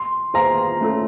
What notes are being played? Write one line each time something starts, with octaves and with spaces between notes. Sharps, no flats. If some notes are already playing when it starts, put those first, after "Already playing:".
Already playing: C6
F4 G#4 C5 F5 G#5 A#5
A3 C#4 F4 A4